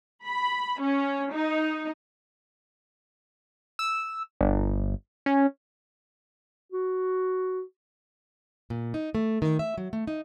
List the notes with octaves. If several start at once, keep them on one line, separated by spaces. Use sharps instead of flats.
B5
C#4
D#4
E6
G1
C#4
F#4
A#2
D#4
A3
D#3
E5
F#3
A3
D#4